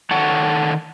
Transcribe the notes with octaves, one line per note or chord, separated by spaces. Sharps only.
D#3 A3 A4 C#5 F#5